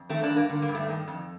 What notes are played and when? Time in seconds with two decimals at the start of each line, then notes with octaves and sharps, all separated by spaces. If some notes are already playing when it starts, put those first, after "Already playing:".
Already playing: F2
0.09 D#3 A3 C4
0.23 A#3 D4
0.29 G2
0.36 A#3
0.49 D3
0.62 A#3
0.68 G2
0.75 A3
0.88 D#3
1.07 F2